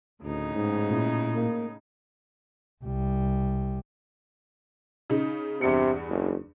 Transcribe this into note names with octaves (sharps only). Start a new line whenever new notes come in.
D2 A2 C#3 D#4
G#2
A#2 C#4 E4
A#3
C2 G3
C#3 D#4
E2 G2 C3 C#7
F#1